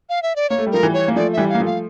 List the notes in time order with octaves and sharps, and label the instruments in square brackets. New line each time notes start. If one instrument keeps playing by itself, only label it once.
[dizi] F5
E5
D5
[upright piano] A#3 [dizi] C#5
[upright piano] A3
G3
[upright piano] F3 A3 [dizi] A#4
[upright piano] E3 G3
[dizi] C#5
[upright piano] A#3
[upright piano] F3 A3 [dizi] D5
[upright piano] E3 G3 [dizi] E5
[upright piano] A#3 [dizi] F5
[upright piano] F3 A3
[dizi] F5